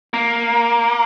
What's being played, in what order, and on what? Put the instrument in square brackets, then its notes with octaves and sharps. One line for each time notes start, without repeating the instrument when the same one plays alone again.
[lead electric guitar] A#3